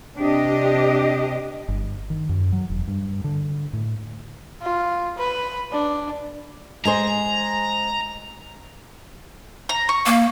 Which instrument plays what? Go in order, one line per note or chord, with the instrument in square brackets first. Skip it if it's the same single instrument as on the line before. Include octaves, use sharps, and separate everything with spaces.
[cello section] C3 D4 G4 D#5
[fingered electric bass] G1
D#3
F#2
F#3
E1
G2
D3
A2
[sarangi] F4
B4
D4
[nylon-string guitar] G#3 G#4 C5 [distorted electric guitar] A#5
[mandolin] A#5
C#6
[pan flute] A#3